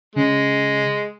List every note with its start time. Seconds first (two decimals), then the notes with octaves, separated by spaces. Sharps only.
0.16 C#3 G#3